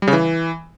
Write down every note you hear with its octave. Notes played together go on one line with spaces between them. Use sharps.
G3
C#3
E3